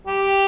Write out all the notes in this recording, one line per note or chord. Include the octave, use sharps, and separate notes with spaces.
G4